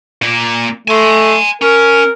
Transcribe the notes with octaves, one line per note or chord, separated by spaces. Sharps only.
A#2 A#3
A3 G#5 C6
C#4 A#4